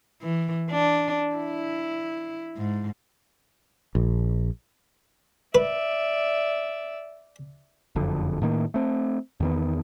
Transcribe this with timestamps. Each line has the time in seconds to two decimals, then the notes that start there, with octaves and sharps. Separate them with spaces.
0.22 E3
0.71 D4
1.36 E4
2.56 G#2
3.95 A#1
5.55 B4 D5 E5
7.95 F#1 F2 D3
8.42 A2 D#3 A#3
8.74 A3 C4
9.40 E2 D#3 B3